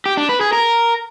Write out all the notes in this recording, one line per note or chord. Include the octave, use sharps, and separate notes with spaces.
G4
D4
B4
G#4
A#4